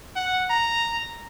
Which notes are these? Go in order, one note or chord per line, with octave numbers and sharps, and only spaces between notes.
F#5
A#5